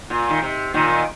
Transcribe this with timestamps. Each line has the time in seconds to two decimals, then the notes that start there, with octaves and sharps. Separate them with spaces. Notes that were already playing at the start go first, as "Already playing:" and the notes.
0.10 A#2
0.30 D#3
0.42 C3
0.74 A#2 D#3